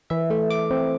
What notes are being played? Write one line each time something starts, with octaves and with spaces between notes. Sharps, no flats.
E3 E5
A3
A3 D6
C4